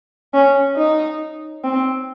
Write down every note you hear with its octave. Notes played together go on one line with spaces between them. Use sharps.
C#4
D#4
C4